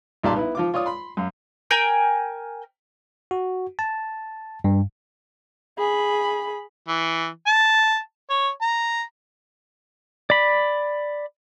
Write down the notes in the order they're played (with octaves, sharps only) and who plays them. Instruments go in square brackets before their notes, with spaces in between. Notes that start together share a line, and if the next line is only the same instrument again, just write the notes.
[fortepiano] B1 A#2 G3 D5 A5 C6
B3 E4
F3 F4 D6
F4 C#5 D5 D#6
B5 C6
F#2 F5
[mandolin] A#4 G5 G#5 G6
[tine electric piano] F#4
A5
G2
[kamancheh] G#4 B5
[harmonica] E3
A5
C#5
A#5
[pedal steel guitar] D5 B5